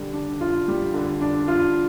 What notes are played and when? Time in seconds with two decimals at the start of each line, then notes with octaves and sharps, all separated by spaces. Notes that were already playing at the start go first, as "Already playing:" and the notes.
Already playing: D3 G3
0.13 D4
0.41 F4
0.68 G3
0.94 D3
1.21 D4
1.48 F4